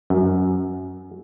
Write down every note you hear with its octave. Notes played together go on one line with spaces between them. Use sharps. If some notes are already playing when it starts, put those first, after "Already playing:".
F#2